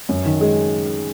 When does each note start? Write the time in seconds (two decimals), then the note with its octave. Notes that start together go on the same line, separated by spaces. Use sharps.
0.09 F#2
0.26 D#3
0.41 G#3